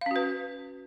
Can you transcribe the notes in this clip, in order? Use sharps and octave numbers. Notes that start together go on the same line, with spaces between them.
C#4 F#4 B4 F5